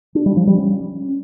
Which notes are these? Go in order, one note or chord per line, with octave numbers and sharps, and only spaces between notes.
D4
G3
F3
G3
C#4